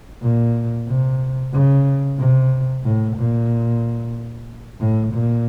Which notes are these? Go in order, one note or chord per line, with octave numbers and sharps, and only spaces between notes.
A#2
C3
C#3
C3
A2
A#2
A2
A#2